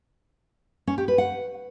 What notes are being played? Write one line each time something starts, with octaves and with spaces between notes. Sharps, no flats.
C#4
G4
B4
F#5